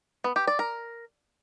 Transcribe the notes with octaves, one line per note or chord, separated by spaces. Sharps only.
B3
G4
D5
A#4